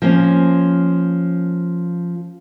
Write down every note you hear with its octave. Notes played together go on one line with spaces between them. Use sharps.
F3 A#3 C#4